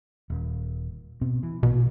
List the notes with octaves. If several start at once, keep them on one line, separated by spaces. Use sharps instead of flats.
D#1
B2 C4
E3
A#1 B2